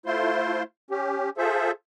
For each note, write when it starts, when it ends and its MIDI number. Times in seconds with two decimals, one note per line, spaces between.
0.06 0.63 57
0.06 0.63 64
0.06 0.63 65
0.06 0.63 72
0.06 0.63 84
0.91 1.30 61
0.91 1.30 67
1.37 1.71 65
1.37 1.71 68
1.37 1.71 69
1.37 1.71 72
1.37 1.71 76